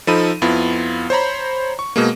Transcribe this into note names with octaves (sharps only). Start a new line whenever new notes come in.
F3 D#4 A4 B5 D#7
F2 B3 E4 F4
C5 C#5 A#5 B5
C#6
B2 G#3 A#3